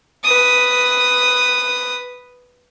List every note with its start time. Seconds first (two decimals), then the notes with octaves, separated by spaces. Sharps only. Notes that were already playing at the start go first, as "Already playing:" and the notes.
0.24 B4 D#6